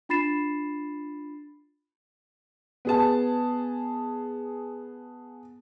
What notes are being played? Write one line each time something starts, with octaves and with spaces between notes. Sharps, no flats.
D4 F4 B5 A6 C7 E7
B3 G#4 A5